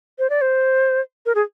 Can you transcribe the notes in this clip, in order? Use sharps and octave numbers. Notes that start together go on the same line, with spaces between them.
C5
D5
C5
A#4
G#4